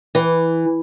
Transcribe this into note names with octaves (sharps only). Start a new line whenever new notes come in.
E3